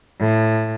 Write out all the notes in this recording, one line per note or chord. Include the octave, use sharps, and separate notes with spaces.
A2